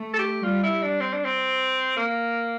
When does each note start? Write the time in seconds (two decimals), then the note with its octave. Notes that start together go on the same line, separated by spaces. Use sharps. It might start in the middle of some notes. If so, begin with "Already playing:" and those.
Already playing: A3
0.14 A4
0.19 G4
0.44 G3 F4
0.63 E4
0.82 D4
1.01 C4
1.13 D4
1.25 C4
1.97 A#3